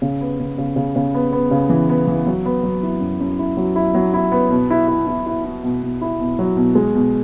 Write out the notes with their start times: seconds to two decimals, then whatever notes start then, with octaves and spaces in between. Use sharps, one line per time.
0.02 C#3
0.21 B3
0.39 C#3
0.58 C#3
0.76 C#3
0.96 C#3
1.14 B3
1.32 B3
1.51 C#3
1.69 E3
1.89 B3
2.07 E3
2.26 F#3
2.46 B3
2.63 F#3
2.83 E4
3.01 F#2
3.20 F#2
3.39 E4
3.57 F#3
3.76 E4
3.95 F#3
4.14 E4
4.32 B3
4.50 B2
4.70 E4
4.88 E4
5.07 E4
5.26 E4
5.44 E4
5.63 B2
5.82 B2
6.01 E4
6.20 B2
6.39 F#3
6.57 B2
6.75 G#3
6.95 B2